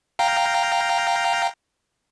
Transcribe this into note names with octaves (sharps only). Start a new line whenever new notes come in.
F5 G5 A#5